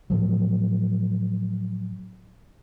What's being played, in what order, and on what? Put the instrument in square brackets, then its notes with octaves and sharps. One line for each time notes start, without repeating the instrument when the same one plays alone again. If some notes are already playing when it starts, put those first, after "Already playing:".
[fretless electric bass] A2 F3 F#3